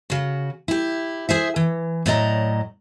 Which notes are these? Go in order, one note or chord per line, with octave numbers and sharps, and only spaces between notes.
C#3 F#4
E4 G4
G#4 C5 E5
E3
A2 F#3 D5 D#5 A#5